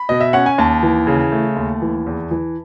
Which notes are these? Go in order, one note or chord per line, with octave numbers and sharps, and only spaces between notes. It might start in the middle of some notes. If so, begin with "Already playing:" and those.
Already playing: B5
B2 D#5
E5
C#4 F#5
G#5
D#2 A5
E3
C#3
A3
D#2
E3
E2
E3